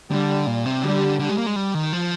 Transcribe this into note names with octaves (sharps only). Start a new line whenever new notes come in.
D3 G3
A#2
C3
D3 G3
D3
G#3
A#3
G#3
G3
D#3
F3